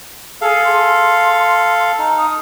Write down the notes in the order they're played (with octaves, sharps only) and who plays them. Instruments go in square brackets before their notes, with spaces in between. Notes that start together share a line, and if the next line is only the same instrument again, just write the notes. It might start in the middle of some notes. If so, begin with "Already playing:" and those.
[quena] G#4 [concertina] A4 F5
[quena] C6
[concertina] D#4
[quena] D#6